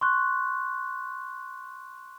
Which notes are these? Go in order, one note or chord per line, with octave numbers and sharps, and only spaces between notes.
C6 C#6 F#6